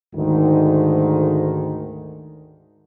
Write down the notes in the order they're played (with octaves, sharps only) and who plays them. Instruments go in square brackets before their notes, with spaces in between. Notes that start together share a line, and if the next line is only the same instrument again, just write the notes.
[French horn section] D2 G#2 D#3